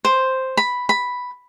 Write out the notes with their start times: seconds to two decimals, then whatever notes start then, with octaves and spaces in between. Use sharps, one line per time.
0.05 C5
0.57 B5
0.89 B5